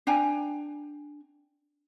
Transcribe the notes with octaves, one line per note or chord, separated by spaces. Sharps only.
D4 G5 G#5 A#5